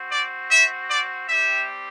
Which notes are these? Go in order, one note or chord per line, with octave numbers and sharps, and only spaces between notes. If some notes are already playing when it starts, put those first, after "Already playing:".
Already playing: C4 F#4
D5
E5
D5
G3 C4 G4 E5